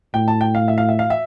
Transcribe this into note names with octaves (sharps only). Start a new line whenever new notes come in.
A2 G5
A5
G5
F5
E5
F5
E5
F5
E5